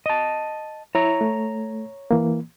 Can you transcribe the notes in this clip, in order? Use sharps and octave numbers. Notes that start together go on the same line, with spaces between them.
D#5 A5
E4 C#5 A#5
A3
E3 A#3